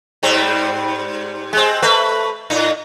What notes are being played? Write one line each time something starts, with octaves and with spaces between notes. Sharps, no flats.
G#2 G3 C4
G#3 C4
A3 B4
A2 D#4